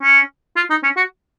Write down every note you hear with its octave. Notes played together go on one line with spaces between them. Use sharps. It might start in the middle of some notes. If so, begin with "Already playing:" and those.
C#4
F4
D#4
C#4
F#4